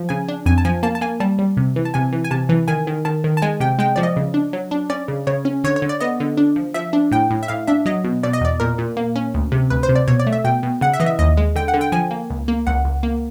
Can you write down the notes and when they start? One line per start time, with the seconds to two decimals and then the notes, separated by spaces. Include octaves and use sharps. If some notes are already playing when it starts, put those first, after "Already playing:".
Already playing: F3
0.09 C#3 G#5
0.28 D4
0.46 F2 G#5
0.58 A5
0.65 F3 G#5
0.83 A#3 A5
0.95 A5
1.01 A#3 G#5
1.20 G3 A5
1.39 G3
1.57 C3
1.76 E3
1.85 A5
1.94 C3 G#5
2.13 E3
2.24 G#5
2.31 C3 A5
2.49 E3
2.68 D#3 G#5
2.87 D#3
3.05 D#3 A5
3.24 D#3
3.37 A5
3.42 G#3 G#5
3.60 C3 G5
3.79 G#3 G5
3.96 F3 D5
4.03 D#5
4.16 C#3
4.34 D4
4.53 F#3
4.71 D4
4.90 C#4 D5
5.08 C#3
5.27 C#3 C#5
5.45 C#4
5.64 D3 C#5
5.76 C#5
5.82 D3
5.89 D5
6.00 B3 D#5
6.20 D3
6.37 D4
6.56 F3
6.74 F3 E5
6.93 D4
7.11 A2 G5
7.31 A2
7.43 E5
7.48 A2 F5
7.67 D4 E5
7.86 F#3 D#5
8.04 B2
8.23 B2 D5
8.33 D#5
8.41 E2 D5
8.60 A#2 A#4
8.78 A#2
8.97 A#3
9.16 C#4
9.34 D2
9.52 C3
9.70 D2 B4
9.83 C5
9.89 C3
9.95 D5
10.08 B2 C#5
10.20 D5
10.27 A3
10.33 E5
10.44 B2 G5
10.63 B2
10.81 C#3 F#5
10.93 E5
11.00 E3 D#5
11.06 E5
11.19 D#2 D#5
11.37 G#3
11.55 D3 G5
11.68 F#5
11.74 D3
11.81 G5
11.92 F3 G#5
12.11 A#3
12.30 C#2
12.48 A#3
12.67 C#2 F#5
12.85 C#2
13.03 A#3